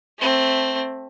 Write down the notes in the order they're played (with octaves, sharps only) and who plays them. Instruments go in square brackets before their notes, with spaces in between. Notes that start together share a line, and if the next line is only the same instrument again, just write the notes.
[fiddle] A3 C4